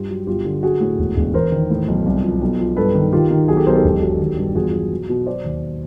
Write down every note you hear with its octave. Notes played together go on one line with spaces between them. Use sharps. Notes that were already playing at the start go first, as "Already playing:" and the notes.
Already playing: G2 F4 G4
F#3
G1 F4 G4
D3
F#3 F#4 G#4
A2
E1
E1
E2 A#4 C5
D#3
A2
B1
C2
F3
B1
F3
G2 A4 B4
D#3
D#3 F4 G4
D#3
B1 F#4 G#4
G4 A4
B1 A#4 C5
G4 A4
E1
F#3
D#3
G2
E2 F#4 G#4
F4
F#3 F#4
B2
B2
F#3 C5 D5
D#2